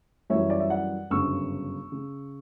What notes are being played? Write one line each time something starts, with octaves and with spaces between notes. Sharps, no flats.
F#2 E3 G3 C#5 E5
D5
E5
D5 F#5
G1 F#2 C#3 C#6 E6
C#3